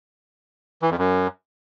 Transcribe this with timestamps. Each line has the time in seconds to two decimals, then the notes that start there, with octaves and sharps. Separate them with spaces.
0.82 E3
0.90 F2
0.98 F#2